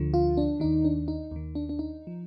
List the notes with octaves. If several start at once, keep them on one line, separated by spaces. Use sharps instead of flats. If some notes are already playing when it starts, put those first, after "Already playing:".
Already playing: D2 D3 F3
F4
D4
D#2 D#3 D#4
D4
D#4
D#2 D#3
D4
D4
D#4
F3